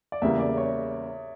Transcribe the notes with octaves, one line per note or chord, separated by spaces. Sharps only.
D5
E2 C#3 G3 A#3 E5
D5
C#5